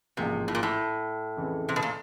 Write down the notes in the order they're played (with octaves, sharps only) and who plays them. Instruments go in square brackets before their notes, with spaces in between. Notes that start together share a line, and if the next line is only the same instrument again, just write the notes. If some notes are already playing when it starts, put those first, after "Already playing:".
[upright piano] A1 G#2 F3 A#3 [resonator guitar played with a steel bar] C3
[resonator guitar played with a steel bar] A2
A#2
A2
[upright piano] F2 C#3 E3
[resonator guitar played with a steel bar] C3
B2
A#2